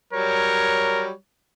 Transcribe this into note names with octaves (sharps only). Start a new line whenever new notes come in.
F#3 G3 A#4 C#5